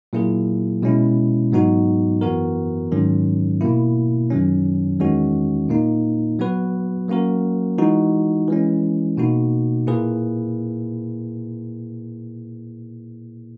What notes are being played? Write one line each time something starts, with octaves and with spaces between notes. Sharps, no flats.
A#2 F#3 A#3 E4 G#4
B2 G#3 C#4 E4
G#2 F#3 B3 D#4 F#4
F#2 E3 B3 F#4 A#4
G#2 D#3 F#3 C#4
B2 A#3 E4
F#2 D#3 F#3 C#4
E2 D#3 G#3 C#4 F#4
A#2 A#3 D#4
F#3 B3 F#4 B4
F#3 A#3 C#4 F#4 A#4
E3 G#3 D#4 F#4
E3 G#3 C#4
B2 A#3 D#4 F#4
A#2 A#3 E4 G#4 B4